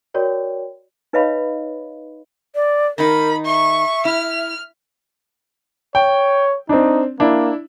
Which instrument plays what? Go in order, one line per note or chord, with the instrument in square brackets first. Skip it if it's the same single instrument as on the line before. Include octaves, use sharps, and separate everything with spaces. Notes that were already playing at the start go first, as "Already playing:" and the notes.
[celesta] F#4 A#4 C#5 D5 G5
[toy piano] D#4 B4 C#5 D#5 F5 B5
[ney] D5
[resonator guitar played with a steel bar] D#3 D#4 [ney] A#4 [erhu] B5
[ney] E5 [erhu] C#6
[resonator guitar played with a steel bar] E4 [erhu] F6
[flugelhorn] C#5 [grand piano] G5
[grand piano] C4 D4 [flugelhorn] D#4
[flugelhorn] A#3 [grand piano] D4 E4